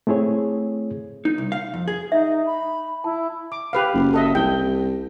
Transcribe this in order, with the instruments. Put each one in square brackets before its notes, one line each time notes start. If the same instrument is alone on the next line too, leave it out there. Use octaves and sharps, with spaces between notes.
[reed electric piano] A3 C4 E4 G#4 C#5
[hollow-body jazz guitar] D#4
C2
F5
F2
G#4
[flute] D#4 [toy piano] E5
[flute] B5
[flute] E4 [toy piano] A5
[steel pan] D6
G4 B4 F5
[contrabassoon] F#1
[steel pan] A4 D#5 E5
[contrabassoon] C2 [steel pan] G5